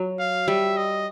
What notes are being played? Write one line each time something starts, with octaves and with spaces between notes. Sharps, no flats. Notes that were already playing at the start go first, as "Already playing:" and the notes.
Already playing: F#3
F5
G3 E5
D#5